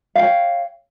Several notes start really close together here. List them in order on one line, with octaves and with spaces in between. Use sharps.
F5 G5 C#5